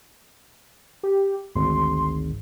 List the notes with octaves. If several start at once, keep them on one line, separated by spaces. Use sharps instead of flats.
G4
G#1 D2 C6